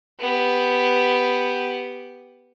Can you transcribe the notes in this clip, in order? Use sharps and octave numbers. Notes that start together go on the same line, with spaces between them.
B3 G4